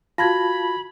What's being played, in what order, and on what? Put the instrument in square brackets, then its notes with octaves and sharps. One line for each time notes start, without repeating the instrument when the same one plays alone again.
[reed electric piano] F4 A5 [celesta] F#4 G#6 A#6 [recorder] B5